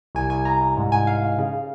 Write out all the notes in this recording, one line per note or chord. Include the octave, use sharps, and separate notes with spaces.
C2 G#5
C2 G#5
C2 A#5
C2
G#2
G#2 G#5
G#2 F5
G#2
C#3
C#3